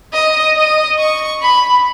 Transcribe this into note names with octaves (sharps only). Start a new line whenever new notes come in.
D#5
D#5
C#6
B5